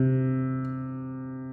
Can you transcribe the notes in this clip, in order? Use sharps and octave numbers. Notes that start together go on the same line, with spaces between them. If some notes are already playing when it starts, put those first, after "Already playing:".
Already playing: C3